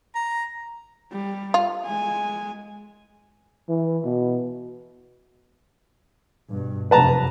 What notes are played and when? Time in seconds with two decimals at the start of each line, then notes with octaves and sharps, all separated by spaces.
0.15 A#5
1.12 G3
1.54 F4
1.86 G#3 G#5
3.69 E3
4.04 B2
6.50 G2 B2
6.91 F1 F#2 C3 B4 A5 A#5